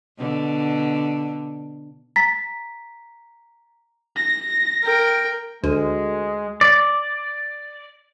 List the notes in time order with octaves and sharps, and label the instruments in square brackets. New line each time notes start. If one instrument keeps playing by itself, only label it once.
[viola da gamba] B2 D3
[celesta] A#5 A6 B6
[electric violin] A#6
[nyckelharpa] A#4 G5
[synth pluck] D2 [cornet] G#3
[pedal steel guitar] D5